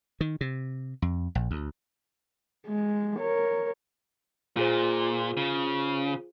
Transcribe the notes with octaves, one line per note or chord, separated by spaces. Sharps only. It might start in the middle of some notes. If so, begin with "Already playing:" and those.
D#3
C3
F2
A#1
D2
G#3
A#4 C#5
A#2 F4 G#4 C5
C#3